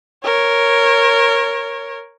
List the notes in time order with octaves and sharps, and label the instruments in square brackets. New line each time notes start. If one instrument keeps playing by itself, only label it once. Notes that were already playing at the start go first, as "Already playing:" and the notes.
[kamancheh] A#4 C#5